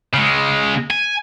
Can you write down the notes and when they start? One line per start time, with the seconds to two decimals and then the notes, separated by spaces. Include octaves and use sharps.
0.14 C#3 G#3
0.91 G#5